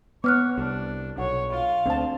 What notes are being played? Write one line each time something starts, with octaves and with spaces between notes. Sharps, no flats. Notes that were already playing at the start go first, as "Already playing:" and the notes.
B3 C#5 D6 F6 F#6
C2 D4
B1 C#5 F#5
F4 F5
D2 D3 C4 A5